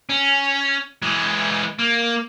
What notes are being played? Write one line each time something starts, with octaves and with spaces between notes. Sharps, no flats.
C#4
E3 G#3
A#3